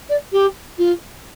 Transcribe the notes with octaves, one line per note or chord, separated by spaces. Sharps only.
D5
G4
F4